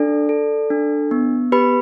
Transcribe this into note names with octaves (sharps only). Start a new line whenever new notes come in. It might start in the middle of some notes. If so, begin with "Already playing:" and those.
Already playing: D4 A4 D5
A4
D4
B3
G4 B4 B5